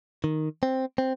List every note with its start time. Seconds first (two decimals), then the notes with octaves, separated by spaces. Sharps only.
0.24 D#3
0.63 C4
0.98 C4